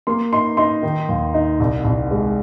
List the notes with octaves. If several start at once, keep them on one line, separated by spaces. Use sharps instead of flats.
A#3 C6
D#4 C6
D#4 C6
D#3
D#2
D#4
C2
C2
G#3